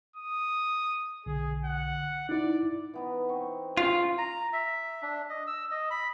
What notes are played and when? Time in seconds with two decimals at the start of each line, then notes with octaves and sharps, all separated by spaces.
0.16 D#6
1.26 B1 D3 G#4
1.65 F#5
2.29 D#4 E4 D5
2.94 E3 B3 D#4
3.29 C4 C#6
3.77 C#3 F4 G#5 C#6
4.18 A#5
4.53 E5
5.02 D4
5.30 D#5
5.47 E6
5.71 D#5
5.91 B5